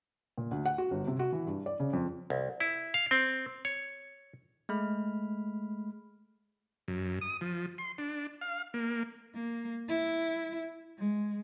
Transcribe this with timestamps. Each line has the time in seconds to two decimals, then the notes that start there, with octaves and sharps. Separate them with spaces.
0.38 A#2
0.51 D2
0.66 F#5
0.78 F#4
0.91 G1
1.07 C3
1.19 F#4
1.32 E3
1.47 G2
1.66 D5
1.80 C#3
1.93 F2
2.30 C2
2.60 E4
2.94 F5
3.11 C4
3.65 C#5
4.69 G#3 A3 B5 F6
6.88 F#2
7.21 D#6
7.41 F3
7.78 C6
7.98 D4
8.41 F5
8.74 A#3
9.34 A#3
9.88 E4
10.98 G#3